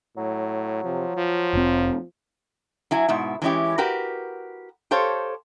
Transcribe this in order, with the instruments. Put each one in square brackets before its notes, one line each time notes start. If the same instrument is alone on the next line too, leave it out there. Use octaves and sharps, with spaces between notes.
[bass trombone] A2 [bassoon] F#3
[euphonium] C3 [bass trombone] F3
[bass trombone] F3 [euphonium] F4
[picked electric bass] F1 C4
[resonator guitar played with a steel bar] F#3 E4 G#5
G#2 B2 E4
E3 G#3 C#4 E4 G4
F#4 G4 A#4 B4
G4 A4 C5 C#5 F5